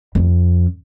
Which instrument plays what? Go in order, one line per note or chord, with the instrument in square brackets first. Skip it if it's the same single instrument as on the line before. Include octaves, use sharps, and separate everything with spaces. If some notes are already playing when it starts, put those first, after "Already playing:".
[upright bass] F2